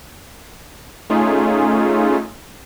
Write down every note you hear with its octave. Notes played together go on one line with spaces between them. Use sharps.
A3 C#4 D#4 F4 G#4